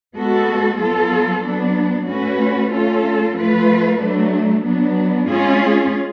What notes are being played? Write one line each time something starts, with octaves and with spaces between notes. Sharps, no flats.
G#3 B3 F#4 A4
F#3 B3 F4 A4
F#3 B3 D4
A3 C#4 F#4 B4
A3 C#4 F4 A4
F3 A3 F4 B4
F#3 A3 D4
F#3 B3 D4
G#3 C#4 F4 G#4